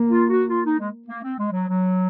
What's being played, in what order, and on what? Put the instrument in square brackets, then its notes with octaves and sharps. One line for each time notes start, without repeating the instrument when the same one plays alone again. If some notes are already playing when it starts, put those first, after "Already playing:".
Already playing: [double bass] A#3
[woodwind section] F4
F#4
F4
D#4
G#3
A#3
C4
G#3
F#3
F#3